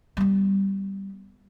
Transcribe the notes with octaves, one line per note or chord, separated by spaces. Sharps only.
G3 B3